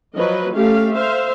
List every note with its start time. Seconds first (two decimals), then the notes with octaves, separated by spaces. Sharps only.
0.15 F3 F#3 B4 D#5
0.54 A3 C#4 G4 F5
0.93 C5 E5 F5